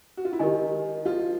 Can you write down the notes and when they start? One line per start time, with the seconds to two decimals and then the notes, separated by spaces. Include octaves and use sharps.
0.17 F#4
0.25 F4
0.33 E4
0.39 D#3 D#4 G4 A#4 D#5 G#5
1.05 F3 F4